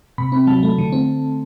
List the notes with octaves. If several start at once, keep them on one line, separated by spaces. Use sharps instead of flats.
C3 B5
C4 B5
F#3 A5
A3
D3
C4